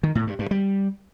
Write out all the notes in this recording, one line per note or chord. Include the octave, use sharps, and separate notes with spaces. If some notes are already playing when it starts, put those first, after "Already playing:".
D#3
A2
G2
G2
G3